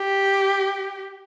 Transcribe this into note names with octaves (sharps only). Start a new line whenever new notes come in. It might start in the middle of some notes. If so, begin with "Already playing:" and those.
Already playing: G4